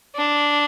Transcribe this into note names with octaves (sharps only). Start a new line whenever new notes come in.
D4